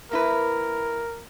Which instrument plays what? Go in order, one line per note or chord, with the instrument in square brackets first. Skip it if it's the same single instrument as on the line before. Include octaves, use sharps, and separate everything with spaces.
[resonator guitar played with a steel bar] A#3 E4 B4 [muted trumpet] A#4